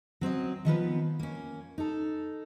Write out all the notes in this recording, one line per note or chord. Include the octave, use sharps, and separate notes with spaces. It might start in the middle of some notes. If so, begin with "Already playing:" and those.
F#3 C4 C#4 D#5
D#3 F3 B3 B4
A#3 C#4
D#4 A4